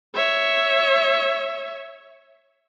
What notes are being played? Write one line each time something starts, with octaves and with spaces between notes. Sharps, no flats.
C#5 E5